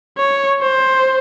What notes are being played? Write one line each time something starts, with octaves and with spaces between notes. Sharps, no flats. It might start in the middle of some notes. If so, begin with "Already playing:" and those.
C#5
C5